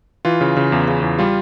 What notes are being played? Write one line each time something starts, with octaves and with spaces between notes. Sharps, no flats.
E3 F4
C#3
C#3
E2
C#3
E2
G3 F4